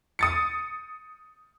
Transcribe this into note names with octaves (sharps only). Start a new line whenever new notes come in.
D#6 A6 C#7